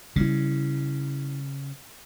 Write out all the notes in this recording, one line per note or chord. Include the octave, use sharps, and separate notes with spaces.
C#3 G3 E4